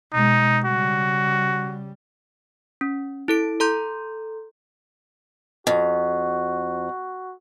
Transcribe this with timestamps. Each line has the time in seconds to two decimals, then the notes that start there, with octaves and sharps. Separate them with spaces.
0.13 B2 G#3 D#4
0.65 C#3 G3 F#4
2.81 C#4
3.28 E4 A4 D7
3.60 A4 A#5 C6 G6
5.67 F2 F#4